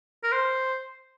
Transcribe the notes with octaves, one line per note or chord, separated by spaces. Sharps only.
A#4
C5